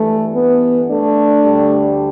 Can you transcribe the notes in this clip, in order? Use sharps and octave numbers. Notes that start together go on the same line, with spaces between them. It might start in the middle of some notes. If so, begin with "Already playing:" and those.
Already playing: G2 E3 A3
B3
A3 D4
D2 D3 G3